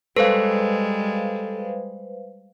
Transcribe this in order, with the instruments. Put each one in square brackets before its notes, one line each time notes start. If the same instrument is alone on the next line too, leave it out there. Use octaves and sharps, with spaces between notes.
[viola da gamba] G3 G#3 [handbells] A4 [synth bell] B4 C5 F5